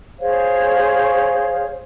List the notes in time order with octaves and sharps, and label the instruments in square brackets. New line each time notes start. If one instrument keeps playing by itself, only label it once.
[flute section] G#4 C5 C#5 F5